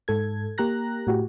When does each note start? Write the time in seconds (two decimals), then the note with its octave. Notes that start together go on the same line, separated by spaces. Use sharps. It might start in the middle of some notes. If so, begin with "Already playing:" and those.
0.08 G#2 A4 G#6
0.58 A#3 G4 A#5 F#6 A#6
1.07 A2 F#4 G4